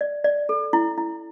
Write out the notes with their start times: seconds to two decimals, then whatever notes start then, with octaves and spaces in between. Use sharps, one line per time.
0.01 D5
0.24 D5
0.49 A4
0.73 E4
0.98 E4